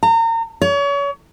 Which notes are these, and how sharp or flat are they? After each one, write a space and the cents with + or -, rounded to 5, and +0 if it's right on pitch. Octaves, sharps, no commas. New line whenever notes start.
A#5 -35
C#5 +35